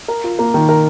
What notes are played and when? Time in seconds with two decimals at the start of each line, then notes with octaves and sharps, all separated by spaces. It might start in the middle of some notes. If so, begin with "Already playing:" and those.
0.08 A#4
0.24 F4
0.39 A#3
0.54 D#3
0.69 A#4